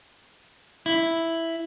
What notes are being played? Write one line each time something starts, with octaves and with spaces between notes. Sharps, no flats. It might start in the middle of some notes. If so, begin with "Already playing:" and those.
E4